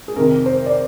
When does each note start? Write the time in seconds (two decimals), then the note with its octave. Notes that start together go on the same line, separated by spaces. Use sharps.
0.08 G#4
0.16 F2 C3 D#3 A#4
0.46 C5
0.66 D5